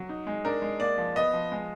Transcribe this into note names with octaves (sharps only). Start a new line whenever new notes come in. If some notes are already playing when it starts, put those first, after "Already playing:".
Already playing: F#3
D#4
G#3
D4 A#4
G#3
A#3 D5
F3
B3 D#5
F3
G#3